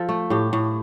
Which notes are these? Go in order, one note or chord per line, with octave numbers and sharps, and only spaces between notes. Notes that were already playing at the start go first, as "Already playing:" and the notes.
Already playing: F3 A4
A3
A2 G4
A2